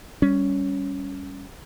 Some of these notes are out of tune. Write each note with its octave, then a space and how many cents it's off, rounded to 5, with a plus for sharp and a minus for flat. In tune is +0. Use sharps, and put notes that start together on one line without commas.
G3 +0 C#4 +5